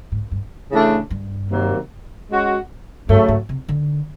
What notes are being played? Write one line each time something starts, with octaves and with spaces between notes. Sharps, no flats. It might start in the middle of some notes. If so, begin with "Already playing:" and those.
G#2
G2
C#3 E3 A3 D4
G2
C3 D#3 F#3 A#3
G#3 C#4 F#4
G2 C#3 F#3 A3
G#2
C3
D3